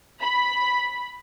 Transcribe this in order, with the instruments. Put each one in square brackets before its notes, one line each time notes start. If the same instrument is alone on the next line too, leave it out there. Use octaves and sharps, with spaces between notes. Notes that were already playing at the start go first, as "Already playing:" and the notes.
[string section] B5